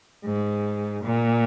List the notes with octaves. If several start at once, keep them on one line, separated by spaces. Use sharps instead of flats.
G#2
A#2